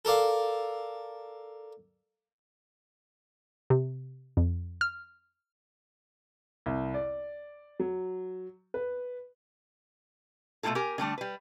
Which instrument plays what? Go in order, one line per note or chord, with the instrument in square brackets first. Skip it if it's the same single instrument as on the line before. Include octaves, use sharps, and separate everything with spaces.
[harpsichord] A4 A#4 D5 F5
[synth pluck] C3
F2
F6
[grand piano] C2
D5
F#3
B4
[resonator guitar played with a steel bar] B2 A3 C4 E4 F4 A4
G4 A#4 G#5
D3 G3 A3 D4
G3 B4